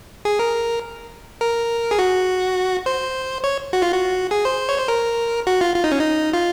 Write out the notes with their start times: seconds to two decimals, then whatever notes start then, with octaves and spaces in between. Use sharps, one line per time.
0.25 G#4
0.39 A#4
1.41 A#4
1.91 G#4
1.99 F#4
2.86 C5
3.44 C#5
3.73 F#4
3.82 F4
3.92 F#4
4.31 G#4
4.45 C5
4.69 C#5
4.78 C5
4.88 A#4
5.47 F#4
5.61 F4
5.76 F4
5.84 D#4
5.92 C#4
6.00 D#4
6.33 F4